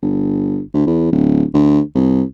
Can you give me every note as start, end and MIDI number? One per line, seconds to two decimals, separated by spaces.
0.02 0.60 31
0.74 0.86 38
0.87 1.11 40
1.12 1.45 26
1.54 1.80 38
1.95 2.23 36